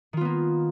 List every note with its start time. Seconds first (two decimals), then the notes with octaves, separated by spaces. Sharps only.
0.13 D#3
0.17 F4
0.21 B3
0.25 A#3